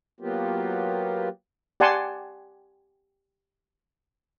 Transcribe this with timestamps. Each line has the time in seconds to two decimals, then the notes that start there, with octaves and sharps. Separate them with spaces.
0.20 F#3 A#3 B3 F4 G4
1.80 G4 D5 F#5 G#5 A5 C6